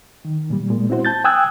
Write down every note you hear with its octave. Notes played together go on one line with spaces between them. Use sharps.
D#3
A#2 G3
A#2 G#3
C4 E4 F#4 C5
A5 G6 A6
G5 G#5 D#6 E6 F#6 G#6